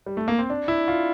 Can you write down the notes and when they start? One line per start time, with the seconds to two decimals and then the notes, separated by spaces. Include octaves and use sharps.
0.06 G3
0.17 A3
0.28 A#3
0.39 C4
0.50 D4
0.68 E4
0.88 F4